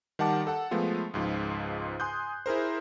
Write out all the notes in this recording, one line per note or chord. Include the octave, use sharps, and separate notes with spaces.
D#3 G3 F#5 A5 D6
A4 F#5 A5
F3 G#3 A3 B3 F4
C#2 G#2 F3 F4
G#5 C6 D#6 F#6 G6
E4 G#4 A#4 C5